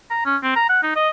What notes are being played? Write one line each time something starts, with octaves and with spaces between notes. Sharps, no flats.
A#5
C#4
C4
A#5
F#5
D#4
D#5